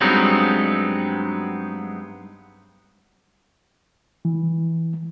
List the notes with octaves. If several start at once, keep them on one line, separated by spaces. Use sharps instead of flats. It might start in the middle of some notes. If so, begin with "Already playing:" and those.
G2 F#3 G#3 B3 C4 D#4
E3